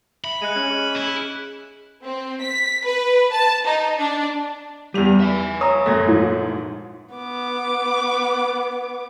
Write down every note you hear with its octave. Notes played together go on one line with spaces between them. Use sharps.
E5 B5
G#3 F#6 C#7 D#7
C#4
G#4 D#5
E4
G#4
C4
B6
B4
A5
D#4
D4
E2 G3 G4 D#7 F7
E5 G#5
C#5 A#5 D#6 E7
A#1 F#2 A3 G#6 A#6
G#2 E3 F3
B3 D6